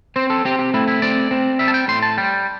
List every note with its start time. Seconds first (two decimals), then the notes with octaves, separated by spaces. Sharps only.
0.16 C4 C5
0.30 A4
0.45 C4 G4
0.59 G4
0.74 A3 E4
0.88 E4
1.02 C4 D5
1.31 C4
1.59 G3 E5
1.68 A5
1.74 G5
1.88 A2 C6
2.02 A5
2.18 G3 G5